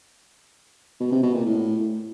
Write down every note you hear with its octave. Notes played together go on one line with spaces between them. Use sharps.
B2
C3
B2
A#2
A2